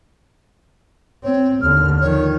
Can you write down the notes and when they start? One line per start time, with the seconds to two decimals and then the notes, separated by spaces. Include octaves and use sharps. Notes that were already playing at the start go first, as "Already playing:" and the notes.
1.24 C4 C#5
1.62 D#2 D3 F6
2.01 D#3 F3 C#5